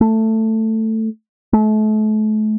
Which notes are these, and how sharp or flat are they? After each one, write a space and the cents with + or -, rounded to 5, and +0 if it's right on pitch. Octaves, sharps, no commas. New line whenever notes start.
A3 +10
A3 -35